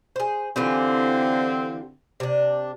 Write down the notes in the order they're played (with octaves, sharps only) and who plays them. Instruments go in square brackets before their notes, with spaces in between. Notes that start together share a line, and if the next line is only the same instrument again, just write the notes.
[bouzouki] G#4 C5
[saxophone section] D3 C4 [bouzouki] E3 F4 G4
[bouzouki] C3 D4